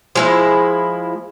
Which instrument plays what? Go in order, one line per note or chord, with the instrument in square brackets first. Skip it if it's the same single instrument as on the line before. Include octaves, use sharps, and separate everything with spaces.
[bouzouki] F3 G#3 E4